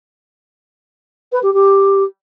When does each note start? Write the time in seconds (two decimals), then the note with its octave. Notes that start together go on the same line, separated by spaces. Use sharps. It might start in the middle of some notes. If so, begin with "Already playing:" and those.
1.32 B4
1.43 G4
1.53 G4